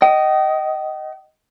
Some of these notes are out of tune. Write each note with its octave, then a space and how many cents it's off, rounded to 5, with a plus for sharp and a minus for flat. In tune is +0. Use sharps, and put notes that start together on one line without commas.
D#5 +0 G5 -40